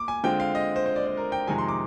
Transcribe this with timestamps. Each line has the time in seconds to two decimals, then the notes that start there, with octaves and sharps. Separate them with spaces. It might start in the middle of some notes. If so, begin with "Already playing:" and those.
Already playing: A#3 D6
0.08 G#5
0.24 D3 G#3 C4 F4 G5
0.40 F5
0.55 D#5
0.76 C5
0.86 C5
0.96 D5
1.07 D5
1.17 A#4
1.32 G5
1.47 F2 C3 D#3 G#3 D#4 G#5
1.58 C6
1.69 D6